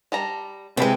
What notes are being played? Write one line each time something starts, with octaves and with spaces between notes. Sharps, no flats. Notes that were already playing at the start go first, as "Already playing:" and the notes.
G3 A5 A#5
C3 E3 G#3 C4 B5